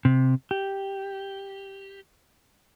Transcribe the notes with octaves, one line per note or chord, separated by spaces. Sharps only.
C3
G4